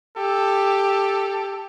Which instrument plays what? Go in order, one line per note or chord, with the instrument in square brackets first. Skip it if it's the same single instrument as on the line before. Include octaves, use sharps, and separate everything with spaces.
[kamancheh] G4 [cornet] A4